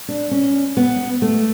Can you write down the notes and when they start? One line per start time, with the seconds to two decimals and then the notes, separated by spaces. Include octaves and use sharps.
0.08 D4
0.31 C#4
0.77 B3
1.22 A3